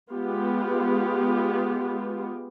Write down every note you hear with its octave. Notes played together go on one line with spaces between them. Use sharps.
G#3 B3 F4 G4